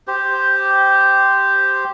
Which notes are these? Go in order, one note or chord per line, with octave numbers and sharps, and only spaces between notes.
G4 C5